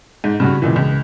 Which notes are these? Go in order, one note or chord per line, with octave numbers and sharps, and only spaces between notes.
G#2
G2 C#3 F#4
C#2 A#2 E3
C#2